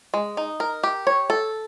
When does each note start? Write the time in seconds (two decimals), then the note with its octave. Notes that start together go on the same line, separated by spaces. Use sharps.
0.14 G#3
0.37 D#4
0.60 A#4
0.83 G4
1.07 C#5
1.30 A4